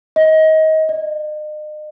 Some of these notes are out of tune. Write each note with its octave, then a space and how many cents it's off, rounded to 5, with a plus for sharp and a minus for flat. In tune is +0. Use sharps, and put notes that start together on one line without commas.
D#5 +25
D#5 -40